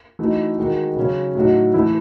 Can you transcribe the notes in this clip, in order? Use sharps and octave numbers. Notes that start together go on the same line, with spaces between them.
E3 A3 D#4 F#4
D#3 G#3 D#4 F#4
C#3 F#3 C#4
A2 F#3 A3 D#4 F#4
E3 A3 E4